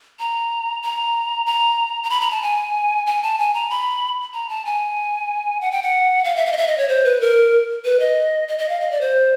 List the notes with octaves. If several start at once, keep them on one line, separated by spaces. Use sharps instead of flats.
A#5
A#5
A#5
A#5
B5
A#5
A5
G#5
G#5
A5
G#5
A#5
B5
A#5
A5
G#5
F#5
G5
F#5
F5
E5
F5
D#5
E5
D#5
C#5
C5
B4
A#4
B4
D#5
D#5
D#5
F5
D#5
D5
C5